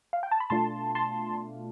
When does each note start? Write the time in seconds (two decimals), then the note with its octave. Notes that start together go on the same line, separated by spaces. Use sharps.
0.13 F5
0.23 G5
0.32 A5
0.40 B5
0.50 B2 A3 D4 F4 A5 C6
0.95 A5 C6